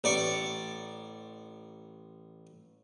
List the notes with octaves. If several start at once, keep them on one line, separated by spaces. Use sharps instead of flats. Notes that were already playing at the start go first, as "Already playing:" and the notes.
A1 D5 C#6